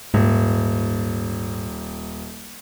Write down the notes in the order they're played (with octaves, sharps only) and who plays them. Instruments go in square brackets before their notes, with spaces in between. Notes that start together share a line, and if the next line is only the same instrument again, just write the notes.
[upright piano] D#1 [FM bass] G#2